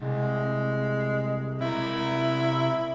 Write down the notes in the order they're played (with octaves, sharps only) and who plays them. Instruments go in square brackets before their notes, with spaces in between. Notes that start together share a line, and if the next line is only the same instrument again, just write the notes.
[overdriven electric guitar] C2 [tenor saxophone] G#3
[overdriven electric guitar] C3 A#4 [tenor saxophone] E4